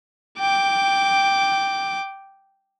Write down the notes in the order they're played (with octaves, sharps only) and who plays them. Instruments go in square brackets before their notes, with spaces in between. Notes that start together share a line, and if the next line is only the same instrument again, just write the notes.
[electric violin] G5 D6